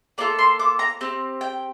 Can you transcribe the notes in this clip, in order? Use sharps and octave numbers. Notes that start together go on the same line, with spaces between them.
A#3 F4 A4 D5
C6
D6
A#5
C4 G4
G5